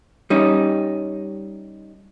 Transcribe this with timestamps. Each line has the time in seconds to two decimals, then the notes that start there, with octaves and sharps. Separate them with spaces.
0.30 G3 C#4 D#4